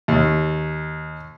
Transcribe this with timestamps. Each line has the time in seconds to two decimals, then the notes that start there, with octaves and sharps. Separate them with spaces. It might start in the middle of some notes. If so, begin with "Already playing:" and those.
0.08 D#2